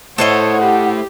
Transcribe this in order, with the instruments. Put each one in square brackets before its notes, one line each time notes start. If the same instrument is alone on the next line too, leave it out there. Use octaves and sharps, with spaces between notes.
[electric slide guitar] A3 E4 [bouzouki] A4 C5 D#5 [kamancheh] C#5 [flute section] F#5
[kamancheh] G4